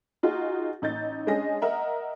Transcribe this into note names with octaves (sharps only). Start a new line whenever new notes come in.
D#4 F4 F#4 G#4
A1 D#4 G6 A6
G#3 C#4 D4 G#4 D#5 A#6
A#4 D#5 E5 F#5 A#5